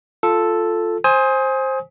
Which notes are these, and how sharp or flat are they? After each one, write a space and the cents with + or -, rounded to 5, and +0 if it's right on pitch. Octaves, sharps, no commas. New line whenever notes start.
F4 +0 A4 +0
C5 +15 G#5 +0 D#6 +30